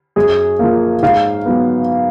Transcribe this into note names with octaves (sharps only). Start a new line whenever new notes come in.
F#2 G#4
F3 A#3
G#2 F5
F#3 B3